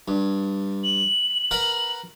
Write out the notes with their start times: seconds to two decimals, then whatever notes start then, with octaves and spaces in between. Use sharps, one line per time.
0.08 G2
0.84 F#7
1.51 A#4 B4 F#5